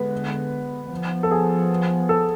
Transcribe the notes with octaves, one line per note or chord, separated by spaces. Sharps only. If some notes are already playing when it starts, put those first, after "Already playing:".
Already playing: D3 G#3 B3 B4
F3 B3
A4
G#4
A4